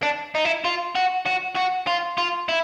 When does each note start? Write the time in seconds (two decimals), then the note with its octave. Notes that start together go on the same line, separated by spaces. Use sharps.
0.03 D4
0.35 D#4
0.45 E4
0.65 F4
0.95 F#4
1.26 F#4
1.56 F#4
1.87 F4
2.18 F4
2.49 E4